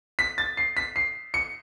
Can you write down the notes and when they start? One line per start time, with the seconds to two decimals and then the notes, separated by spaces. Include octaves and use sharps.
0.19 B6
0.38 A6
0.57 C7
0.77 B6
0.96 C7
1.34 C#7